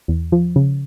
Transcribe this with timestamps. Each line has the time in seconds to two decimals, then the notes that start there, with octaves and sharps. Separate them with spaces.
0.08 E2
0.32 F3
0.56 C#3